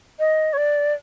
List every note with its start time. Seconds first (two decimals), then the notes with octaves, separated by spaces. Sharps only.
0.19 D#5
0.53 C#5
0.58 D5